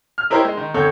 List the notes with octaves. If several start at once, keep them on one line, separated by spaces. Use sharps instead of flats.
F6
D#4 E4 G4 A#4 C5 C#5
G#3
D#3
F2 D3 A4 C#5 G6